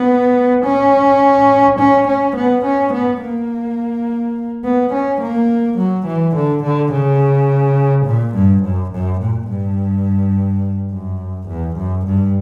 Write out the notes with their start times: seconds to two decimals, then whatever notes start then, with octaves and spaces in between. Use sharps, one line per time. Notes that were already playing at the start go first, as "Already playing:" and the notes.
Already playing: B3
0.65 C#4
1.79 C#4
2.08 C#4
2.36 B3
2.65 C#4
2.93 B3
3.22 A#3
4.65 B3
4.93 C#4
5.21 A#3
5.78 F#3
6.07 E3
6.35 D3
6.63 D3
6.92 C#3
8.06 A#2
8.35 G2
8.63 F#2
8.92 F#2
9.20 A#2
9.49 G2
10.92 F#2
11.48 E2
11.76 F#2
12.06 G2